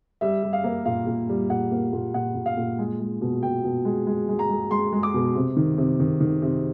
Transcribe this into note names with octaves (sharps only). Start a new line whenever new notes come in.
G3 E5
G3
F5
A#3
A#2 F5
A#2
G3
A#2 F#5
A#3
A#2
A#2 F#5
A#2
F5
A#2
G#3
G#3
B2
B2 G5
B2
G#3
G#3
G#3
A#5
G#3
G#3 C6
G#3
D6
B2
C3
D#3
C3
D#3
D#3
C3